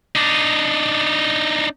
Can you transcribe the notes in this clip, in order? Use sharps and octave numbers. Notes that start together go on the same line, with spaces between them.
D4 D#4